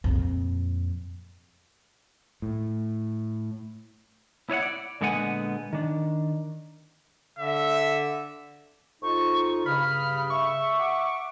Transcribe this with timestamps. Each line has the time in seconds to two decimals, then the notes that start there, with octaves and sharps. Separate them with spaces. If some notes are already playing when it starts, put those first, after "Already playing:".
0.04 F2 A#2
2.42 A2
4.50 E4 C#5 D#5 F#5
4.63 D5
5.01 A#2 D3 G#3 B3 F#5 G#5
5.73 D#3 D4
7.39 D3 E5
9.02 F2 D#4 F4 C#6
9.66 G2 C#3 B5 F6
10.30 E5 C#6
10.79 F#5 D6